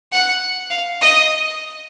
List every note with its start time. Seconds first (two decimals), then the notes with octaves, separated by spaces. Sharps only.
0.12 F#5
0.70 F5
1.01 D#5